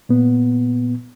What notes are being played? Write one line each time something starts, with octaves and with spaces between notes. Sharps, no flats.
A#2 B3